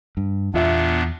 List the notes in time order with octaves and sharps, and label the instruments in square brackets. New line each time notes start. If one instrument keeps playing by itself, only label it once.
[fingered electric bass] G2
[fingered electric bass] E2 [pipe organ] A#2 B3 D4 [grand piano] F4 E5